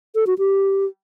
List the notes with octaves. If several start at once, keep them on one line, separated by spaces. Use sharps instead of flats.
A4
F#4
G4